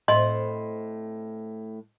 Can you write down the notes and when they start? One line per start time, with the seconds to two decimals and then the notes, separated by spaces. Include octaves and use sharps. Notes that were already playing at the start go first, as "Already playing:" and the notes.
0.08 A2 C4 E4 D#5 C6